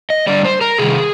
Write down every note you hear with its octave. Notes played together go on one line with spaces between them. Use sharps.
D#5
D3 G3 D5
C5
A#4
C3 D#3 G3 G#4